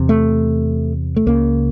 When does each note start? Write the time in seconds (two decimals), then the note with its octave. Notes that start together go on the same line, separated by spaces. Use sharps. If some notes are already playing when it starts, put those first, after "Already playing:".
Already playing: E2 C3
0.09 A3
1.16 A3
1.27 C#2 C#3 A#3